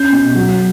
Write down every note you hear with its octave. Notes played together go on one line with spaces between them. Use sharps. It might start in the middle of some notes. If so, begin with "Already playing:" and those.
Already playing: C#4 G6
B2
F#3